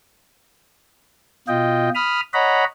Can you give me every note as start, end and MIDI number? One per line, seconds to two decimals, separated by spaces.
1.48 1.90 47
1.48 1.90 65
1.48 1.90 75
1.48 1.90 79
1.95 2.21 83
1.95 2.21 87
1.95 2.21 89
2.34 2.64 73
2.34 2.64 75
2.34 2.64 78
2.34 2.64 82
2.34 2.64 83